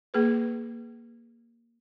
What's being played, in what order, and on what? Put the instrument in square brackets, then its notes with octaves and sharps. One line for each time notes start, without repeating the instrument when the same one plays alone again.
[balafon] A#3 G#4 B4